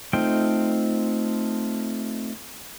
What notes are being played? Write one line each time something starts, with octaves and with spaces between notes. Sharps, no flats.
A3 C4 D#4 F4 G5